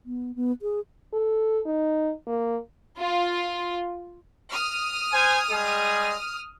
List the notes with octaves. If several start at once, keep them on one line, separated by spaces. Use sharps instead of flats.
B3
B3
G#4
A4
D#4
A#3
F4
D#6 F6
C5 G#5
G3 G#3 G#4